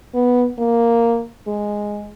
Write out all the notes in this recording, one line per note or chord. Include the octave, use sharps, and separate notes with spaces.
B3
A#3
G#3